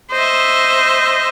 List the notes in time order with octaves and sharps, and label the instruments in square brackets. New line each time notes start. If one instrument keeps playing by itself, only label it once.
[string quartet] C5 D#5 E5